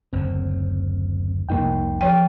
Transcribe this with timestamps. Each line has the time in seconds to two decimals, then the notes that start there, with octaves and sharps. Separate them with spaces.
0.13 F#1 D2 C4
1.49 F1 C2 F2 A#3 D#4 G5
2.01 F3 G5